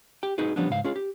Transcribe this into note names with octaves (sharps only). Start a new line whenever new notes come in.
G4 G5
D#4 F#4 G#4 B4
F3 G3 B3 C#4 D4
C#2 G#2 F5
C#4 F4 G#4
G4